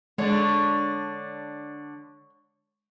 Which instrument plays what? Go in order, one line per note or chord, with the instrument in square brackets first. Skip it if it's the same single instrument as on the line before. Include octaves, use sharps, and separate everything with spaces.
[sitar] D3 D4 [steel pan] G#3 [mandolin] C#5